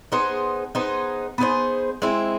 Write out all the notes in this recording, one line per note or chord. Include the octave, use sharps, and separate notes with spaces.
B3 D#4 G#4 C5
B3 D#4 G#4 C5
B3 D#4 G#4 C5
G#3 C4 E4